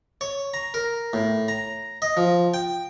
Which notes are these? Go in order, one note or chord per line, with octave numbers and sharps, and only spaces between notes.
C#5
A#5
A#4
A2
A#5
D#5
F3
G5